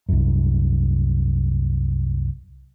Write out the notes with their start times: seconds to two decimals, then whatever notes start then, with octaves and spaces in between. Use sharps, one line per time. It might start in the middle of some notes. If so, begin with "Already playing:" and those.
0.09 C2 F#2